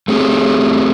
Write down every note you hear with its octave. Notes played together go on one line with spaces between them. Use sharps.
A3 C4 G4 G#4